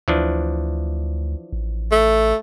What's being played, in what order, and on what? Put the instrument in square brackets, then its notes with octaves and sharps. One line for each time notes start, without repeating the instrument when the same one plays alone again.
[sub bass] D2 [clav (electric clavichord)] E3 F3 D4
[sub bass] A1
[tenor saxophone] A3